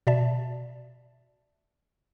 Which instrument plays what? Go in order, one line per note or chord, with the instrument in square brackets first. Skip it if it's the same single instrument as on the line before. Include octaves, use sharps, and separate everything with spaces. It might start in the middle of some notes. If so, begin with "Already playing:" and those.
[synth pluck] B2 D5 E5 A5